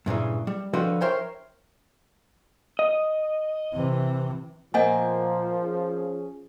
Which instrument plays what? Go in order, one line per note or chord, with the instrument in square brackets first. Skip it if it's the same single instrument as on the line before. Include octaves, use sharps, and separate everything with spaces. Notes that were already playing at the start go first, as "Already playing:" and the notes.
[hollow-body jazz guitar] G2 A#2 C#3 E3
G3
D3 F3 F#4 B4 D#5 G5
A#4 C5 C#5 E5 G5
[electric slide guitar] D#5
[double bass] C3 E3
[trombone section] A#2 [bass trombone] F3 [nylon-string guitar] A#3 C4 [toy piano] D#5 F#5 G#5
[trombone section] C#4 G#4